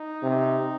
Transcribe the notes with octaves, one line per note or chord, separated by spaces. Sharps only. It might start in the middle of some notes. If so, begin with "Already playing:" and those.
Already playing: D#4
C3